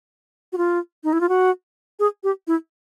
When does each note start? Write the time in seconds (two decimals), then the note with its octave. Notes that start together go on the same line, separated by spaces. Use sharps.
0.52 F#4
0.58 F4
1.04 D#4
1.13 E4
1.21 F4
1.29 F#4
1.99 G#4
2.24 G4
2.47 E4